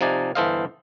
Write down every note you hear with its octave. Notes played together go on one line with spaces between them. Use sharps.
C3 F3 D#4 D5 G#5
G1 E3 A4 C5 D#5 F5